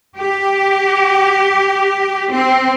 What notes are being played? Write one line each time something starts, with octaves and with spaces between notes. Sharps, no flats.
G4
C4